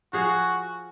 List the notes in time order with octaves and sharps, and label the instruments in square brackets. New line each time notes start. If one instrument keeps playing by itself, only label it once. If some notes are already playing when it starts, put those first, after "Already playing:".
[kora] F3 G#4 F5 [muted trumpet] F#4